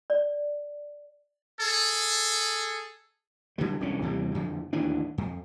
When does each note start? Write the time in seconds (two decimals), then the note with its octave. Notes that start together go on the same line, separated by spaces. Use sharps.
0.10 D5
1.61 G#4 A4
3.58 D3 F#3 G3
3.80 E1 C2 D3 C#4
4.02 D#2 C3 E3 G3
4.35 F2 D3 F3
4.73 D1 D#2 E3 D4
5.18 F2